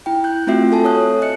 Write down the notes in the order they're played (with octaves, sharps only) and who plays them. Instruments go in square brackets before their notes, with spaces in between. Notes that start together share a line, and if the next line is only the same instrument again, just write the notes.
[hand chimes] E4 G5
F#6 G6
A3 C4 F4 F#4 E5 C7
A4 G#5 A5
A4 C#5 D#6 F#6
D#5 F#6 C#7